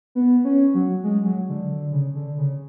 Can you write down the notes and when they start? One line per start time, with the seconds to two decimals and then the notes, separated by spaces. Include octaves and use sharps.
0.15 B3
0.44 C#4
0.74 F#3
1.04 G#3
1.25 F#3
1.49 D3
1.70 D3
1.92 C#3
2.15 D3
2.38 C#3